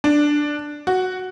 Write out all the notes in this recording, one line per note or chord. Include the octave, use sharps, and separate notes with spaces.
D4
F#4